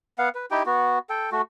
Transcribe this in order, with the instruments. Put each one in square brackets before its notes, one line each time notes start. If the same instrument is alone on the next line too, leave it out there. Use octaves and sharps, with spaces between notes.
[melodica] B3 F5 F#5
B4
D#4 E4 G4 G5
B3 F#4
A4 G5
A3 F#4